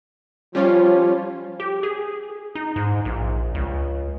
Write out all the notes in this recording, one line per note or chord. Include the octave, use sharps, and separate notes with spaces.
F3 G3 C#4 F4 C#5
G4
G#4
D#4
G#2
A#1
C#2